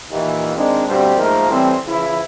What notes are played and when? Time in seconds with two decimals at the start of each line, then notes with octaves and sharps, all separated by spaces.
0.11 D#2 A#2 E3
0.55 D#3 G#3 C4 D4
0.88 D2 G2 B2 G3 C4 C5
1.17 G#2 F3 A3 A#3 D#4 A#4
1.50 A2 E3 G3 C4
1.86 C#3 E3 F3 E4